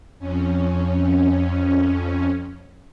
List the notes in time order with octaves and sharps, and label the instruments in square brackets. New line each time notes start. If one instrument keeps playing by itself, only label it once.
[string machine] F2 C#4